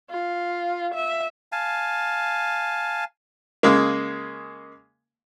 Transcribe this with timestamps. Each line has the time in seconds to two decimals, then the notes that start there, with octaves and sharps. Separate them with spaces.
0.10 F4
0.95 E5
1.52 F5 G#5 A5
3.63 C#3 G#3 A#3